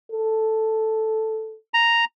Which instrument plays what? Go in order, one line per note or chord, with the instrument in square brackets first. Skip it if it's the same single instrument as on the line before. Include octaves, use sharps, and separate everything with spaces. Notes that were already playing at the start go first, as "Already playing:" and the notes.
[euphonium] A4
[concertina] A#5